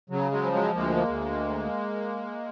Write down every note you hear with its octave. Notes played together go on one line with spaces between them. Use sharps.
C#3 F#3
F#3 G#3
F3
F#3 G#3
D2 G#3 A#3
D2